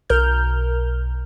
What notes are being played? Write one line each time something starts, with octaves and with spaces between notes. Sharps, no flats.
B1 A#4 F6 G6